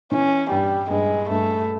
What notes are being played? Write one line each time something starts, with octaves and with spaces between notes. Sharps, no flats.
E3 C#4
G2 G3
G2 G#3
G2 A3